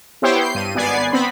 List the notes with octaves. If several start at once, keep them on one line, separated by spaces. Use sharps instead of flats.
B3 E4 G4 C5 C#5 G5
G6 C7
G2 D#7
G#1 B3 D5 G#5 C7
B3 C4 B5